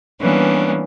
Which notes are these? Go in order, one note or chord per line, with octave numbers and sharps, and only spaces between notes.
E3 G3 A#3 B3 C#4 D4